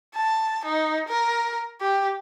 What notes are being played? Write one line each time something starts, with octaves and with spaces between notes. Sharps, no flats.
A5
D#4
A#4
G4